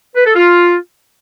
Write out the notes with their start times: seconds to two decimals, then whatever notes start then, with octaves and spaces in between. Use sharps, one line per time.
0.16 B4
0.26 A4
0.36 F4